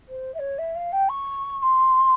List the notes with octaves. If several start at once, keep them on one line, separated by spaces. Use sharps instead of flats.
C5
E5
C#5
E5
F5
G5
C#6
C#6
C6